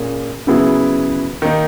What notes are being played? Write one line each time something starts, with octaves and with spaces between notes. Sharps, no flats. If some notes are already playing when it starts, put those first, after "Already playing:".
Already playing: A#2 A#3 C#4 G#4
C#3 F#3 B3 E4 G#4
D#3 A#3 D#4